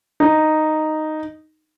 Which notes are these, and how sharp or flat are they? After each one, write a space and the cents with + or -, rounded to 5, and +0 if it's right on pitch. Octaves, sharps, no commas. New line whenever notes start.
D#4 -5